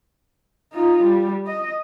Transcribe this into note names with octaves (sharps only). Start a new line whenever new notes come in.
D#4 F4
G3
D#5